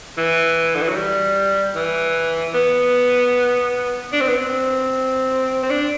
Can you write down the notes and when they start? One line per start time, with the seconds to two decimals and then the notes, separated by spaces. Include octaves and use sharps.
0.17 E3
0.75 D3
0.82 E3
0.89 F#3
0.96 G3
1.75 E3
2.54 B3
4.12 D4
4.21 C4
4.28 B3
4.37 C4
5.63 C4
5.70 D4